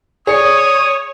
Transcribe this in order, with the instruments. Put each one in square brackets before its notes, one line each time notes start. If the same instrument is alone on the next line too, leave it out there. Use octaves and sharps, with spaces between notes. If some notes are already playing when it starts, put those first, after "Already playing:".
[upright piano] G#4 D5 C#7 [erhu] C#5 [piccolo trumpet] D#6